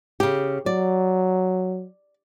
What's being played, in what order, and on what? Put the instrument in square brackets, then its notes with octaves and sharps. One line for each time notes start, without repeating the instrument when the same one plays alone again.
[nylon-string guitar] C#3 G4
[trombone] F#3 [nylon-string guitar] D5